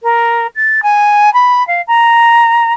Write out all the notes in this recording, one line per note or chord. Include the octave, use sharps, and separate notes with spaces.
A#4
A6
G#5
B5
F5
A#5